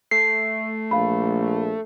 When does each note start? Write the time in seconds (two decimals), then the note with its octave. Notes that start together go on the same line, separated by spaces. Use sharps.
0.11 A3 C7
0.91 A#1 F5 B5